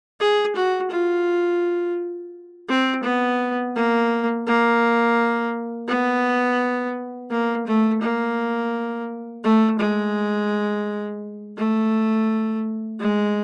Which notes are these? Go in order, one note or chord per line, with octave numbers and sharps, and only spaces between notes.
G#4
F#4
F4
C4
B3
A#3
A#3
B3
A#3
A3
A#3
A3
G#3
A3
G#3